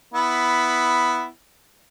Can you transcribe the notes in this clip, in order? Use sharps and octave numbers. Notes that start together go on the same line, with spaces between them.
B3 E4